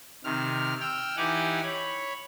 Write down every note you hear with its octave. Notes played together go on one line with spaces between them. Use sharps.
C3 D#3 F6
G5 E6 F6
E3 D#4 G4 F#5 G#5 D6
C#5 B5